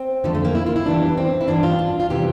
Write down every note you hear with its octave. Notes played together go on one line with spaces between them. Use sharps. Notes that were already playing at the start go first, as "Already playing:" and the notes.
Already playing: C4
F2 D3 F3 A3
A3
A#3
E4
F4
E4
E2 E3 G3 D4
C4
E4
G2 E3 G3 D4
F4
D4
F4
C3 E3 G3 G4